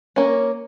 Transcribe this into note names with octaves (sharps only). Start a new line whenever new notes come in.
A#3 C#4